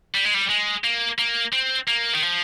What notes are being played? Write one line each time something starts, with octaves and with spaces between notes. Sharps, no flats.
G3
G#3
G3
G#3
A#3
A#3
C4
A#3
D#3
F3